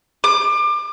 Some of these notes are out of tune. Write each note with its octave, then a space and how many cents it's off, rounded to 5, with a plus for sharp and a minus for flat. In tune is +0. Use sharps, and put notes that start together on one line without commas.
D6 +30